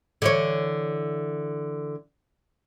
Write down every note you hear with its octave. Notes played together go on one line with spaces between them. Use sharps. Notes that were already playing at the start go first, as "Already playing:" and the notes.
D3 E3 C#5